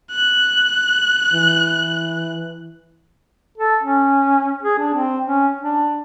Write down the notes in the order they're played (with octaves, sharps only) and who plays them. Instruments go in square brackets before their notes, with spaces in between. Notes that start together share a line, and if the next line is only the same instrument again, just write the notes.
[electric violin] F#6
[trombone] E3
[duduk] A4
C#4
G#4
D4
C4
C#4
D4